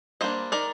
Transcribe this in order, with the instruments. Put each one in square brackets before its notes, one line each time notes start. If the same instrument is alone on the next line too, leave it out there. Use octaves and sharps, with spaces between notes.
[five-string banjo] G3 A#3 D4 C5 D#5
D#3 A#4 D5